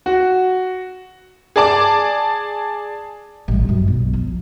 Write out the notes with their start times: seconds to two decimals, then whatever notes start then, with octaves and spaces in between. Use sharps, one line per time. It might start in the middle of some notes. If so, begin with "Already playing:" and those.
0.06 F#4
1.56 G#4 D5 A5 D6
3.48 A1 G3
3.69 F#2
3.88 B1
4.13 F3